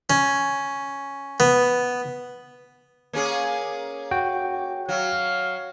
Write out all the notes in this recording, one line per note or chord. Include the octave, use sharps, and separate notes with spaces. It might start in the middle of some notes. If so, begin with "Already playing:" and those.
C#4
B3
A#3 C#4 G#4
F#4 G5
F#3 F5